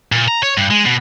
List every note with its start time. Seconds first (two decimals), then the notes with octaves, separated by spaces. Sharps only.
0.12 A#2
0.28 A#5
0.43 C#5
0.57 G2
0.70 G#3
0.85 B2